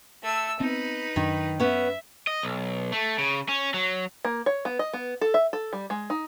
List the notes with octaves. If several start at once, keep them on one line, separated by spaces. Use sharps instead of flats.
A3 E6
B3 C4 D#4 B4
F#2 D#3 D4
B3 C#4 E5
D#5
B1
A3
C#3
C#4
F#3
A#3
C#5
B3
D#5
B3
A4
E5
A4
G3
G#3
D#4